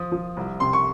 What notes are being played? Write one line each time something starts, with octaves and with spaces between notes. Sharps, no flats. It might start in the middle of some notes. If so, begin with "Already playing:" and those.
Already playing: F3 D#6
F3
C2
C3 C6
C#6